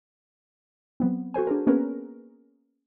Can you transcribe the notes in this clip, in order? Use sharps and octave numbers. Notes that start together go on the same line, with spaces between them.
F#3 B3 C4
F#4 A4 C5 G#5
D4 G#4 A#4
A#3 B3 C#4 G#4 A#4 B4